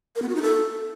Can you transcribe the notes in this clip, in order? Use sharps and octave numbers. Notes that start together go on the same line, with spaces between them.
A#4
B3
F#4
D#4
A4